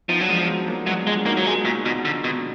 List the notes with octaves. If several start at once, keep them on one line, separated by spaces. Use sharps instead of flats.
F3 B3 D#4
F#3 D4
F3 G#3 B3
F#3
F3 G#3
F#3 A#3
F#3 G#3 B3
G#3 D4 F4
A#3 D#4 F#4
F#3
G#3
A#2
B2
D3
B2